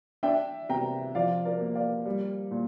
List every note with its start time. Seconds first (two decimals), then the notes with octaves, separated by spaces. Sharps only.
0.23 D4 E5 G5
0.69 C3 G5 A#5
1.15 F3 D5 F5
1.45 A#4 D5
1.60 A#3
1.75 D5 F5
2.05 G3
2.51 A#2